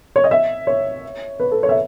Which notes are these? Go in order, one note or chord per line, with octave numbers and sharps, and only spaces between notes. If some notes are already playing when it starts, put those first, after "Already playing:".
C#5
D#5
E5
C#5
B4
A4
C#5
E5